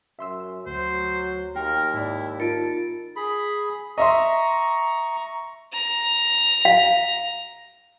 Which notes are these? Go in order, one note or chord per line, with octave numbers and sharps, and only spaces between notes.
F#2 E5 C6 E6
D2 F#3 C5
D#2 A#4 G5
G#2 E4 D5
D#4 F4 A#4 A5 C#7 D7
G#4 B5
D#5 E5 A#5 C6 C#6
A#5
F5